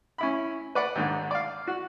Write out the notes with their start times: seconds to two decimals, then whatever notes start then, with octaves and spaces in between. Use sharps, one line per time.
0.18 C#4 E4 B5
0.75 B4 D5 F#5
0.95 D#2 G#2 D3
1.31 D5 F5
1.67 F#4